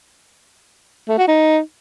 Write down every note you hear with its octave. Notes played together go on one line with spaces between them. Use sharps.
A3
F#4
D#4